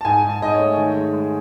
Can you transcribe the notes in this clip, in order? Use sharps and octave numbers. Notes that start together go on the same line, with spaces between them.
A5
G#2 G#5
G#2
A5
G#2 D#5
C#5
A3
D#3
G#3
G#3